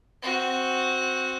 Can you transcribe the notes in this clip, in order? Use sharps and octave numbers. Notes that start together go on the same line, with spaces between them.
C4 F#4